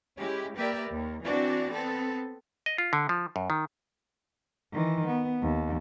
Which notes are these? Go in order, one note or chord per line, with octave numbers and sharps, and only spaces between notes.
G#3 C#4 E4 G4
A#3 G4 A#4 B4 D5 E5
D#2
E3 C4 D4 F#4 D5
B3 C4 A4
D#5
F4
D3
F3
F#2
D#3
D#3 E3
B3
D#2